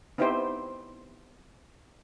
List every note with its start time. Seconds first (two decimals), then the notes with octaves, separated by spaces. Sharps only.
0.18 B3 C4 D#4 E4 G4 C5